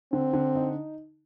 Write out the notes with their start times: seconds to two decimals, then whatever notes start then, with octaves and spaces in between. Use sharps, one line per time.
0.13 D3 C4
0.33 D3
0.55 D#4